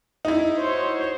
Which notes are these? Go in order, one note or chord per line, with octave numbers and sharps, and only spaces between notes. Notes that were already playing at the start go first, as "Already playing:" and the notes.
D#4 E4
F#4 C5 C#5